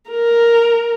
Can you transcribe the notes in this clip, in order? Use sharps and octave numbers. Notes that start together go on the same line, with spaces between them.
A#4